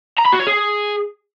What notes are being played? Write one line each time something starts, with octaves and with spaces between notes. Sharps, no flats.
A#5
B5
F#4
C#5
G#4